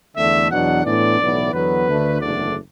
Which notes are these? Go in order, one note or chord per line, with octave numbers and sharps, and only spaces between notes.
E2 D3 A3 D4 E5
E2 B2 F#3 D4 F#5
A2 E3 B3 D4 D5
B1 A2 E3 B3
E2 D3 F#3 B3 B4
D2 D3 A3 D4
F#1 E2 D3 A3 D4 D5